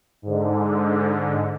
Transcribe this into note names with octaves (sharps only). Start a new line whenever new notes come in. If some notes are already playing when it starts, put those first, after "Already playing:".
G#2 D3